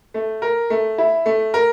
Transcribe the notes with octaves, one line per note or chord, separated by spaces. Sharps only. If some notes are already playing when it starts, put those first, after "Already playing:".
A3
A#4
A3
E4
A3
A#4